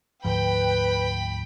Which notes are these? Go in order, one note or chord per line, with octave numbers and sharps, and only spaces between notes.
D2 G#2 F3 B4 G5 B5